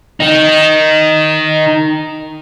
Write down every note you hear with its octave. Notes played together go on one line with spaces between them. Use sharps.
D#3 D#4